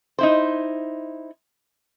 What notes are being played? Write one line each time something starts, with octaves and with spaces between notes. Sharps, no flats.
D#4 E4 C5